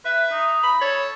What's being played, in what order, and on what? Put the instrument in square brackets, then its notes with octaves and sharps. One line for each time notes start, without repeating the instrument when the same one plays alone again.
[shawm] B4 [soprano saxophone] E5
[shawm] D#4
[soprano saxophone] B5
[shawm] A4 [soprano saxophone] C#5